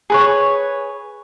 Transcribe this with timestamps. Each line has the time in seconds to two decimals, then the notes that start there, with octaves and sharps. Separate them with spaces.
0.10 G#4 B4 C#5